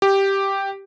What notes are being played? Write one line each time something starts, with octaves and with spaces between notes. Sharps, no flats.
G4